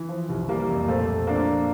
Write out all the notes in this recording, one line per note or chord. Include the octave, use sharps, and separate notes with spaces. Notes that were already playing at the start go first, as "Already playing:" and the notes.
Already playing: E3
F3
C2
E3 G3 A#3
F2
A#2 A3 C4
A#2
F3 A#3 D4
F3